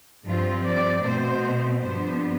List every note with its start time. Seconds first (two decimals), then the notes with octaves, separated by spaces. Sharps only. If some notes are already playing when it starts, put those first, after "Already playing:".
0.25 G2 F3 C4 F4
0.64 D5
1.03 B2 A3 C4 C5
1.83 G2 F3 B3 D4 C5